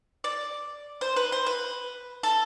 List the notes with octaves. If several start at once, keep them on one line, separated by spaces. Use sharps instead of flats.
D5
C5
B4
C5
B4
A4